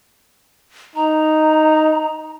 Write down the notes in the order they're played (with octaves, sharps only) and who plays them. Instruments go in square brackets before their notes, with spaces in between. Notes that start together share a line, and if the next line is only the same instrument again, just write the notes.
[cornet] D#4 [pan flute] A#5